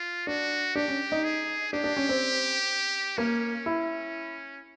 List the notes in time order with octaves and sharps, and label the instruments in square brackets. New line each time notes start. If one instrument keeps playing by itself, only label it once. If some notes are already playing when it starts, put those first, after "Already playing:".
Already playing: [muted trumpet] F4
[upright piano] D4 [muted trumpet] F#4
[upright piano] D4 [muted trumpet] G4
[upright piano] C#4
D#4
[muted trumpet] G#4
[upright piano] D4 [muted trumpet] G4
[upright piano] D4
C#4
C4
[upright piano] A#3 [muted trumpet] C#4
[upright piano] E4